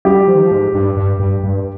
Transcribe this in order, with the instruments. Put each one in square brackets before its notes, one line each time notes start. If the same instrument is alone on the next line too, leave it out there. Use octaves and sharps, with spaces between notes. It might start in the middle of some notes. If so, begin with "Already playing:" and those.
[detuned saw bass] G3 [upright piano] G4
[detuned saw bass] F3
D#3
F3
G#2
G2
G2
G2
G2